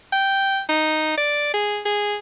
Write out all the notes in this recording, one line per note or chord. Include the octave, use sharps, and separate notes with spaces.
G5
D#4
D5
G#4
G#4